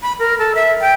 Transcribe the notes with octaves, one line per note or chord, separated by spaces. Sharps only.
B5
A#4
A4
E5
G5